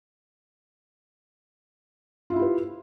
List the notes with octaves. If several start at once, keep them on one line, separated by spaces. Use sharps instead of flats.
E4 F4 G4 B4 E5